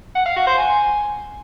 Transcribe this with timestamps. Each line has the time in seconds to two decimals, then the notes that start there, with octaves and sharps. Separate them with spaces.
0.15 F#5
0.26 F5
0.36 F#4
0.47 C5
0.58 G#5